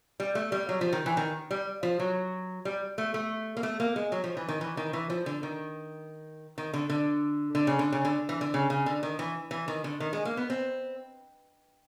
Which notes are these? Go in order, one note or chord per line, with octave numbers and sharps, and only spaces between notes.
G3
A3
G3
F#3
F3
D#3
E3
D#3
G3
F3
F#3
G3
A3
A3
A#3
A3
A#3
G#3
F#3
F3
E3
D#3
E3
D#3
E3
F3
D3
D#3
D#3
D3
D3
D3
C#3
D3
C#3
D3
E3
D3
C#3
C#3
D3
D#3
E3
E3
D#3
D3
D#3
G#3
A#3
B3
C4